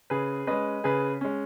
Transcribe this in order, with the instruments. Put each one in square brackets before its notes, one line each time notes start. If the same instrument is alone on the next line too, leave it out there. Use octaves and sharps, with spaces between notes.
[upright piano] C#3 G#4 B4
G#3 C#4 B4 D#5
C#3 G#4 B4
G#3 C#4